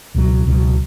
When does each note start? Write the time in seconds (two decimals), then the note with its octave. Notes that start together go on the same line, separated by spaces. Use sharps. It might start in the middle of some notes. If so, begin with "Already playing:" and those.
0.15 C#2 B2 F#3
0.45 C#2 B2 F#3